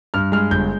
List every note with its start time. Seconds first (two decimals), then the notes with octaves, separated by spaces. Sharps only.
0.14 G2 F6
0.32 G#3 F6
0.51 G1 G6